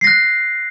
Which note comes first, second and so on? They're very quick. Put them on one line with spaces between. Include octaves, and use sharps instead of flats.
C7 A#6 F#6